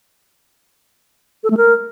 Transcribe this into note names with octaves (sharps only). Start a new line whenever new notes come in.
A4
A3
A#4